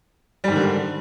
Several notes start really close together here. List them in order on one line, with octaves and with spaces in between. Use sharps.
G3 G#2 D#3 D3